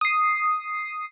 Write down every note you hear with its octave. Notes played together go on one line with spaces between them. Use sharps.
D#6 C7